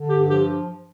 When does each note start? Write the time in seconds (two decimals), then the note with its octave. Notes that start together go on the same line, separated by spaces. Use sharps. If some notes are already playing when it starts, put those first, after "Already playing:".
Already playing: D3
0.09 G2 G4
0.29 F3 G4